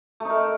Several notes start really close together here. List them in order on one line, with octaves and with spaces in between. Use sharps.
A3 D#4 A#4